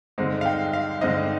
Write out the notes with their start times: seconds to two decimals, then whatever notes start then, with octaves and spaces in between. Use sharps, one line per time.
0.18 G2 D3 G#3 C4 D#4
0.41 F5
0.46 G5
0.73 F5
1.01 G2 D3 G#3 C4 D#4 D#5